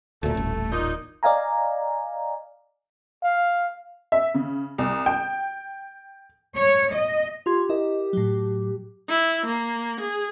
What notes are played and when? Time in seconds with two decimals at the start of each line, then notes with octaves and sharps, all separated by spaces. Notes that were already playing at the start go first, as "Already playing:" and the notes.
0.23 D2 A#2 A3
0.35 D#1 A1
0.72 A#2 D#4
1.23 D5 D#5 F5 G#5 A#5
3.24 F5
4.12 E5
4.34 C#3
4.78 C2
5.06 G5
6.57 C#5
6.92 D#5
7.46 F4 G4 C6 G#6
7.69 E4 A#4 D#5
8.13 A2 F#3
9.09 E4
9.47 A#3
10.01 G#4